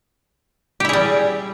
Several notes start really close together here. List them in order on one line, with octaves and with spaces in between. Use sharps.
G4 E4 G#4 G3